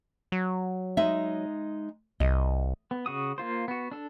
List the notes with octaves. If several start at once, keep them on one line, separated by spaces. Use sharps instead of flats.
F#3
G#3 D#4 E5
C2 D#5
B3
C#3 F#4 D#6
A#3 F4 C5
B3 F#4
D4 A4